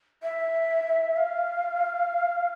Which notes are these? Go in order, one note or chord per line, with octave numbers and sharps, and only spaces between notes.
E5
F5